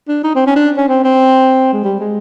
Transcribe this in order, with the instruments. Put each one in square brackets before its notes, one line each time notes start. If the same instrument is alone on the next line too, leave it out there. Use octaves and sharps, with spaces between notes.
[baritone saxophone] D4
D#4
C4
C#4
D4
C#4
C4
C4
G#3
G3
G#3